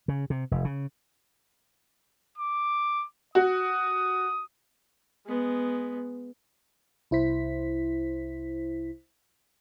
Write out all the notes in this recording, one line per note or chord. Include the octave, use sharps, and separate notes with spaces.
C#3
C3
F1
C#3
D6
F#4 D#6
G#3 B3
C2 E4 C5 B6